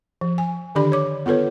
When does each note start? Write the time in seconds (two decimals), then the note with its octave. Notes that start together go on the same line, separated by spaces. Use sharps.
0.21 F3
0.38 G#5
0.75 D3 D#3 D4 G4 D5 B5
0.92 C#5 D6
1.26 B3 F4 A4 B4 C#5